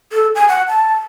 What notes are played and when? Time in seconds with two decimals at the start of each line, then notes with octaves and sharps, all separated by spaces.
0.13 A4
0.35 G#5
0.49 F#5
0.68 A5